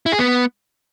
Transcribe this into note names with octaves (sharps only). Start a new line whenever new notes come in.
E4
G#4
B3